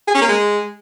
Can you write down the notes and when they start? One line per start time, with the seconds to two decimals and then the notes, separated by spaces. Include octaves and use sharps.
0.08 G#4
0.14 C#4
0.21 A#3
0.28 G#3